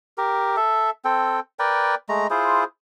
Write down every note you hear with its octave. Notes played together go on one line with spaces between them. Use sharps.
G4 A#4
A4 E5
C4 A4 G5
A#4 B4 D5 G5
G#3 A3 A#5
E4 F4 G#4 C5